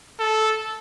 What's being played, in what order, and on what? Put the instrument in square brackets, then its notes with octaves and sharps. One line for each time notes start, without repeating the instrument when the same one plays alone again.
[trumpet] A4